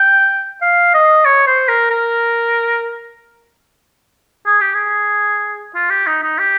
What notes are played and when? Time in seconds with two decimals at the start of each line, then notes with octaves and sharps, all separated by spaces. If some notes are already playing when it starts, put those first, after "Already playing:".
Already playing: G5
0.62 F5
0.94 D#5
1.25 C#5
1.47 C5
1.68 A#4
1.90 A#4
4.46 G#4
4.61 G4
4.74 G#4
5.75 F4
5.90 G4
6.07 D#4
6.23 D#4
6.39 G4